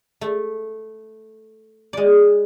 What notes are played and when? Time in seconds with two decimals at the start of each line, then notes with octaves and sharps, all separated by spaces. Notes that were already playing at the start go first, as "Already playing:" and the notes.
0.21 A3
1.93 G#3 D5